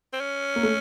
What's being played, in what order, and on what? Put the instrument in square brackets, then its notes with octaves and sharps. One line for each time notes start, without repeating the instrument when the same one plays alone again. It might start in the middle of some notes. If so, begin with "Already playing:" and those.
[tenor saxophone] C4
C#4
[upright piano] A#3
A3